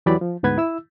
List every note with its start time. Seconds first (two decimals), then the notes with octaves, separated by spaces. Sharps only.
0.06 E2 E3 F#3 G4 D5 B5
0.21 F3
0.43 D2 G#2 B3 B4 G#6
0.58 E4 E6